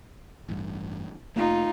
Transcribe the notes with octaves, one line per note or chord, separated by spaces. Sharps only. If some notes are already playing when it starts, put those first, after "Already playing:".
A1 G2
F1 A3 A#3 D#4 F4